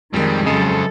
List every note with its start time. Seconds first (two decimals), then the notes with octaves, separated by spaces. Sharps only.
0.14 F2 D#3 G3 G#3
0.46 F#2 C#3 A4 C5 D#5